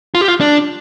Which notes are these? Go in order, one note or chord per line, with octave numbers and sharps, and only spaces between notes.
F4
G4
F4
D4